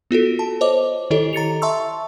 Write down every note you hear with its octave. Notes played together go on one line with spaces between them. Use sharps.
B3 F4 F#4 A4
A5
C5 C#5 D#5 D6
D#3 E4 G4 A4 C#5 D#5
A#5 A6 C#7 F7
E5 A5 C6 C#6 E6